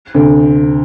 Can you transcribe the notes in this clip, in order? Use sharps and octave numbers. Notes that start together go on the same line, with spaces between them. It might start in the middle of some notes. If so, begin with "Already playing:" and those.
D2 C3